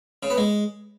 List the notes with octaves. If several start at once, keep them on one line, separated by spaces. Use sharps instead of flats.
C#3
B3
G#3